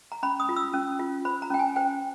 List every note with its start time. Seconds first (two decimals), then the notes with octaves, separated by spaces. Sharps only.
0.12 A#5
0.23 C#4 B5
0.40 D#6
0.49 F4
0.56 E6
0.74 C#4
0.99 F4
1.25 C5 B5
1.42 A#5
1.50 C#4 G5
1.59 G#5
1.76 C5 G5